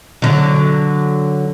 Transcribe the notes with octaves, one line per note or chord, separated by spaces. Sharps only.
D3 F#3